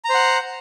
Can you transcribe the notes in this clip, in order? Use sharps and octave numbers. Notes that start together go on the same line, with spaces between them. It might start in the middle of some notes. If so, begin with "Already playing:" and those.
C5 F#5 A#5